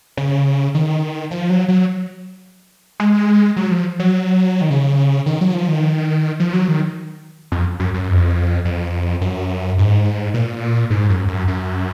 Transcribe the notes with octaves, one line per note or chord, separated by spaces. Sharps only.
C#3
D#3
F3
F#3
F#3
G#3
F#3
F3
F#3
D#3
C#3
D#3
F#3
F3
D#3
F3
F#3
D#3
F2
F#2
F#2
F2
F2
F#2
G#2
A#2
G#2
F#2
F#2
F#2